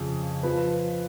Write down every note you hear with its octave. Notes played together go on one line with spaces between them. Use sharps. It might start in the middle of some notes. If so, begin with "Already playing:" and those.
Already playing: F2 C#3 F3
F3 B4